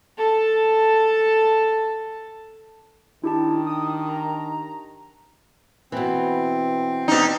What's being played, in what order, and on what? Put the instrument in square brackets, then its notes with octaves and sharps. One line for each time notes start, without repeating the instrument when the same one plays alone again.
[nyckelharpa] A4 A5
[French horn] D#3 [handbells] D4 G4 A5 [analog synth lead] E4
[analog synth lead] D#6
A#5
[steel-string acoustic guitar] B2 E3 [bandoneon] C4
[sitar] B2 D#4